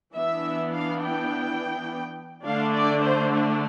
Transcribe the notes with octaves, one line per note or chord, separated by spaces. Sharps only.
E3 B3 D4 E5
F5
G5
D3 A3 D4 F5
D5
C5
D4